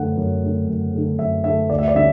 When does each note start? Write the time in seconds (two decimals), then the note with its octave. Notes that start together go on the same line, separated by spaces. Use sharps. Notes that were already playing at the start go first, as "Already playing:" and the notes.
Already playing: F#2 D3 A3 F#5
0.17 F#2
0.43 D3 A3
0.68 F#2
0.94 D3 A3
1.19 F#2 E5
1.44 D3 A3 E5
1.70 D2 D5
1.79 E5
1.88 D5
1.95 D3 G3 C#4 E5